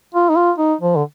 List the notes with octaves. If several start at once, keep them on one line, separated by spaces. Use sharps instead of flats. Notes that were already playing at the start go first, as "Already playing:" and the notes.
F4
D#4
F4
D#4
F3
D3